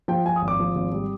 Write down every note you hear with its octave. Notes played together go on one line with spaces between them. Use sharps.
F3 G5
F3 G#5
D#6
G#1
D6
F3
G#1
G3